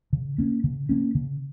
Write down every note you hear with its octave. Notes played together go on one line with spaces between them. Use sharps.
C#3
A#3 C#4
C#3
A#3 C#4
C#3